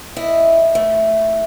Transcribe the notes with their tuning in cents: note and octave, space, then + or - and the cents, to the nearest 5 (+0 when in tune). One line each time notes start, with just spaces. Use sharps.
E4 +0 D#5 -10
E3 -45 A3 +0